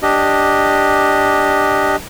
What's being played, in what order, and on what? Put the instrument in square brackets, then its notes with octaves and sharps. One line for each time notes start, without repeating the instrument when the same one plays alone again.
[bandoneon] D4 G4 D#5